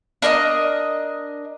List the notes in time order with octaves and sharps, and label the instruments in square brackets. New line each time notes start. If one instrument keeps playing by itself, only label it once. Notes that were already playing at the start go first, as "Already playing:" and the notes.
[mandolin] D4 A#4 C#5 D#5